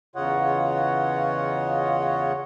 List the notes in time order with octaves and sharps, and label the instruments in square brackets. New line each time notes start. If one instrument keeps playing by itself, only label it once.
[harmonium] E2 C#3 F4 C#5 D#5 F#5